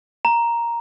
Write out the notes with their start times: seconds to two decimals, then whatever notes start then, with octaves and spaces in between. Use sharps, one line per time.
0.25 A#5